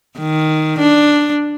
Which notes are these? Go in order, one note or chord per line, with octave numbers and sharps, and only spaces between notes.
D#3
D4